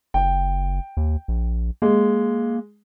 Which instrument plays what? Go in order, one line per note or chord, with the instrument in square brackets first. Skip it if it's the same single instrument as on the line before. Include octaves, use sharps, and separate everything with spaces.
[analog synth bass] F#1 [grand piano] G5
[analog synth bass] D#2
A#1
[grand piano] G#3 [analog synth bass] A#3